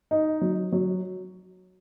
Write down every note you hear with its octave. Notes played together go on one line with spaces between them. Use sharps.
D#4
F#3
F#3